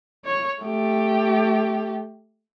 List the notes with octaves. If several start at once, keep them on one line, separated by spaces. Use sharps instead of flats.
C#5
A3 G4